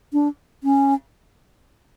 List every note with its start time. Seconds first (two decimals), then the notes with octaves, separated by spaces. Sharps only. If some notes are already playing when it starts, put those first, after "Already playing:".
0.13 D4
0.64 C#4